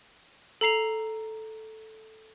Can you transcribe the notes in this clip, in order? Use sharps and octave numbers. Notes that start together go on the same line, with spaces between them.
A4 A#5 C7 F7